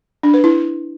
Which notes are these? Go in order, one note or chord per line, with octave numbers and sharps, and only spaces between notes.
D4
B4
E4